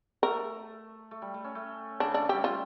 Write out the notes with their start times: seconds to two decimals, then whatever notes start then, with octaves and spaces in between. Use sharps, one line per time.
0.23 A3 A#4
1.11 A3
1.22 G3
1.34 A3
1.44 C#4
1.55 A3
2.00 C#3 D4
2.12 A3 D4
2.22 A3
2.29 G3 G4
2.44 F4